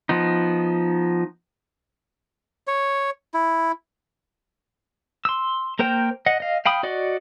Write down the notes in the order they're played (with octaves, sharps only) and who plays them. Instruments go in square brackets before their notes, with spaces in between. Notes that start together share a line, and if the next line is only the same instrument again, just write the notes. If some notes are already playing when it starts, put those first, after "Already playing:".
[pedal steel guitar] F3 B3 D#4
[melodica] C#5
E4
[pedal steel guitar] C6 E6
A#3 A#4 C5 G5
D#5 F#5
D#5 F5
F5 G5 B5 D#6
F#4 D5 D#5 F#5